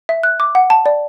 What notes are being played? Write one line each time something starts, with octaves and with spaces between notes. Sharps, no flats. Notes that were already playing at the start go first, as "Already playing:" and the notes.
E5
F#6
D6
F#5
A5
D5